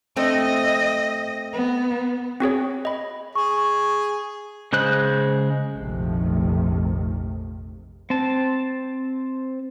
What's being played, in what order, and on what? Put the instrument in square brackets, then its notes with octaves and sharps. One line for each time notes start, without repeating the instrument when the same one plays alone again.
[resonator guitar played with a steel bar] A3 C4 [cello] D#5
[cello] B3
[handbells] C4 F#4 G#4 C#5
D#5 B5
[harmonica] G#4 [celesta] C#6
[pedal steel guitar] C#3 G#3 C5 F#6
[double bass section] F1 A#1 C3 D#3 F3 A3
[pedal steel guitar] C4 A5